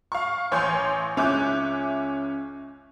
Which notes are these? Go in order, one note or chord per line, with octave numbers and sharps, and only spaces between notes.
F5 C#6
A1 C#5 G#5 C6 G6
C#2 C#4 E5 D6 F#6 G6